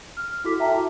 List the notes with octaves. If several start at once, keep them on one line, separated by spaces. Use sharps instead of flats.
F6
E4 F#4 A4 D6 B6
E5 G5 A5 A#5
F#4